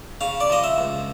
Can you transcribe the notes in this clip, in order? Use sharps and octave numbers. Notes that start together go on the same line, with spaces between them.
C#3 F5
D5
F3 D#5
E5
C#2